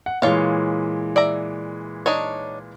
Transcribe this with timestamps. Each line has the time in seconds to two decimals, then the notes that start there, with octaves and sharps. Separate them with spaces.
0.06 F#5
0.22 A#2 E3 G#3 F4 C#5 F5
1.16 D5 E5 A#5
2.06 D4 D#4 C#5